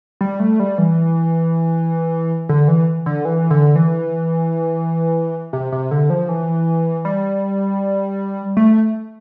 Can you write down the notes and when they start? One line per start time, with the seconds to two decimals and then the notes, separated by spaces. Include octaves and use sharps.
0.21 G3
0.40 A3
0.60 G3
0.78 E3
2.49 D3
2.68 E3
3.06 D3
3.25 E3
3.51 D3
3.76 E3
5.53 C3
5.72 C3
5.91 D3
6.10 F3
6.29 E3
7.05 G3
8.57 A3